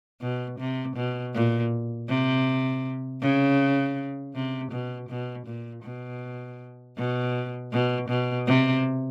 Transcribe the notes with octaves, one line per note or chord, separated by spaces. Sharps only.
B2
C3
B2
A#2
C3
C#3
C3
B2
B2
A#2
B2
B2
B2
B2
C3